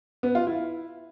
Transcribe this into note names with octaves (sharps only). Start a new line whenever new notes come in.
B3
F4
E4